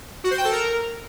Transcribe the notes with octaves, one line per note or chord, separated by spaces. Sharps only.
F#4
C5
G5
A4
A#4